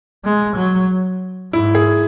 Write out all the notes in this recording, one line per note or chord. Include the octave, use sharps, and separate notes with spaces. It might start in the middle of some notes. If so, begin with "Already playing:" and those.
G#3
F#3
G#2 E4
G#4